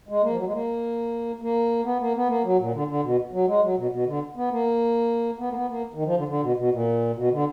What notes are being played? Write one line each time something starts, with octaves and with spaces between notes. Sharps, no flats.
G#3
A#3
F3
F#3
G#3
A#3
A#3
B3
A#3
B3
A#3
F#3
A#2
D3
D3
B2
F#3
G#3
F#3
B2
B2
D3
B3
A#3
B3
A#3
B3
A#3
D#3
F3
D3
D3
B2
B2
A#2
B2
D3